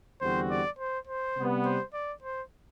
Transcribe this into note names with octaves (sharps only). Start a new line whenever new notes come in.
E2 D3 G3 C4 F#4 C5
D5
C5
C5
C3 G3 B3
C5
D5
C5